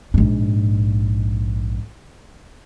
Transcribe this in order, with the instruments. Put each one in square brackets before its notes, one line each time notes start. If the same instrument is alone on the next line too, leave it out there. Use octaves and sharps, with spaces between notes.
[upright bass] A#1 G#2